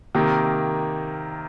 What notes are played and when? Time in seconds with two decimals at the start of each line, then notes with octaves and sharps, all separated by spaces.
0.15 C3 D#3 A#3